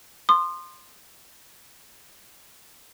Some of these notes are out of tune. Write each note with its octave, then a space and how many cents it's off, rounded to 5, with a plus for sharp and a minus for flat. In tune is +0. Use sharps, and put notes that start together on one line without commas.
C6 +0 D#6 -35